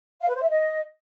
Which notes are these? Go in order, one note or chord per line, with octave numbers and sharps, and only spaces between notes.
F5
B4
C5
E5
D#5